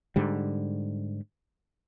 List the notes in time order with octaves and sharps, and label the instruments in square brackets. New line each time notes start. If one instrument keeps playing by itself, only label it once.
[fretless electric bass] G#2 D3 G3